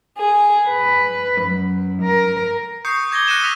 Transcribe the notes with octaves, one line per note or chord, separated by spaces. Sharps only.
G#4
B4
F#2
A#4
C#6 D#6 G6 C7 C#7
D6 G#6 A#6 C#7 G7
F#6 A#6 C#7 D#7 E7 G7
D#6 E6 A#6 B6 F7